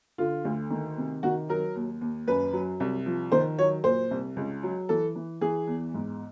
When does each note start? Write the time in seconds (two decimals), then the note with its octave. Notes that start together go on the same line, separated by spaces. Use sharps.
0.18 D3 F4
0.45 D2
0.70 D#3
0.97 C3
1.23 D#3 F#4
1.49 F#3 A#4
1.76 D#2
2.01 D#2
2.27 F#2 B4
2.53 F#3
2.80 C2
3.06 F3
3.32 D#3 C5
3.58 F#3 C#5
3.84 A#2 C5
4.11 C2
4.36 C#2
4.63 F#3
4.89 E3 A4
5.15 E3
5.41 E3 G#4
5.67 E2
5.94 G#2